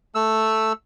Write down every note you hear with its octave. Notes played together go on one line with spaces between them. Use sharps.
A3 E6